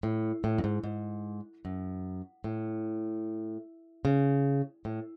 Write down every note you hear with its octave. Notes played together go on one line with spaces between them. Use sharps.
A2
A2
F#2
G#2
G#2
F#2
A2
C#3
A2